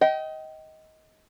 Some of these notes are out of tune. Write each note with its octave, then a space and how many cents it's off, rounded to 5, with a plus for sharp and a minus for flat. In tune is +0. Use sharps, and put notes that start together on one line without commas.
D#5 +20 G5 -25